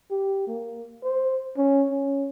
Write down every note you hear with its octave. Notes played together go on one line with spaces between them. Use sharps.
G4
A#3
C5
C#4
C#4